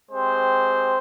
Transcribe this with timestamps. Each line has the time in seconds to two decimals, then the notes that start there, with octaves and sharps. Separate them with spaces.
0.11 G#3 C4 G4 C5